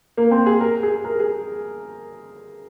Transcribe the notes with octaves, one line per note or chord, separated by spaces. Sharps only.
A#3
C4
G#4
A#4
G#4
A#4
G#4